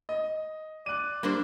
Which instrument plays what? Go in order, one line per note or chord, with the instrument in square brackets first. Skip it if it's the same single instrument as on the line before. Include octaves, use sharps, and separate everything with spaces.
[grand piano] D#5
[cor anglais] D5 [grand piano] F#6 D#7
[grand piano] G3 [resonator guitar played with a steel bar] A#3 D4 C5